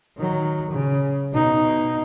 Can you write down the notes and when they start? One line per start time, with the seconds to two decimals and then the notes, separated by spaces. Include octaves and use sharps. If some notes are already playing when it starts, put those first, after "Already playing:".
0.17 D#3 F#3
0.71 C#3
1.32 B2 D#4